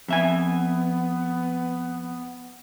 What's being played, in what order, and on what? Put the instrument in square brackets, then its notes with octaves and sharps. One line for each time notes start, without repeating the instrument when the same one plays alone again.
[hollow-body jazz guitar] F2 E5 G#5 [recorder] B3